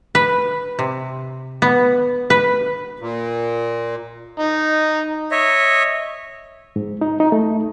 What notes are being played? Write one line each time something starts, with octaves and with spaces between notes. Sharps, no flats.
B4
C3
B3
B4
A#2
D#4
C#5 D#5 E5
G#2
D#4
D#4
A3